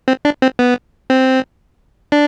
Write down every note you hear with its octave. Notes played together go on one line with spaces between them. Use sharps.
C4
D4
C4
B3
C4
D4